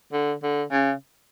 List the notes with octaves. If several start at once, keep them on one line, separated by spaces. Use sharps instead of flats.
D3
D3
C#3